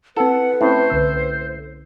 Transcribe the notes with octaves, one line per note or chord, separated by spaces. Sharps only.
C4 E4 A4 B4 F#5
A2 C4 C#4 E4 C5
C2 D3 E6